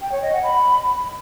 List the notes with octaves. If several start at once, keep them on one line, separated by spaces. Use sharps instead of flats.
G5
C#5
D#5
F#5
B5